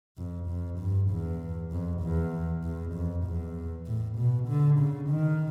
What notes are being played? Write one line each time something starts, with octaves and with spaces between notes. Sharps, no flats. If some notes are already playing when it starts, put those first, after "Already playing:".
F2
F2
G2
E2
F2
E2
E2
F2
E2
A2
B2
D3
C#3
D#3